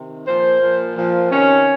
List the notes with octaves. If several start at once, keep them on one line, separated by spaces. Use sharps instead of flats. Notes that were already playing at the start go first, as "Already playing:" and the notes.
Already playing: C3 D#3
A#2 F3 C5
A#2 F3
A#2 F3
C3 D#3 C#4